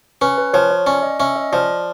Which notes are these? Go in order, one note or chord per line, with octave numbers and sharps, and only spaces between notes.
C#4 B4
B4
F3 C#5
C#5
C#4 D5
D#5
C#4 E5
D#5
F3 D5